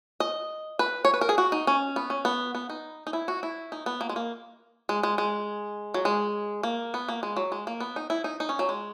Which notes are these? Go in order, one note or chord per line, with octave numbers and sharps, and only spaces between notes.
D#5
B4
C#5
B4
A#4
G#4
F#4
D#4
C#4
B3
C#4
B3
B3
D#4
D#4
E4
F#4
E4
D#4
B3
A#3
G#3
A#3
G#3
G#3
G#3
F#3
G#3
A#3
B3
A#3
G#3
F#3
G#3
A#3
B3
D#4
E4
D#4
D#4
C#4
F#3
G#3